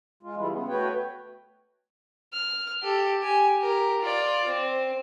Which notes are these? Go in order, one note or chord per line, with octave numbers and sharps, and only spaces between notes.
G#3 F4
E3 G3 G#3 E4 F4
C#3 B3
A3 B3 F#4 B4 C#5 G5
F6
G4 A4
G4 G#5
G4 A#4
F4 D5
C4